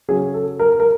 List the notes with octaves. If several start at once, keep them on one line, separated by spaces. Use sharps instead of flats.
C#3 F#3 G#4
A4
A#4
A#4